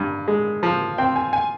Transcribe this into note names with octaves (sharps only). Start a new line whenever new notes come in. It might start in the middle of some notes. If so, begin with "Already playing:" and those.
Already playing: G2
G#3
F3
C4 G5
G#5
G#5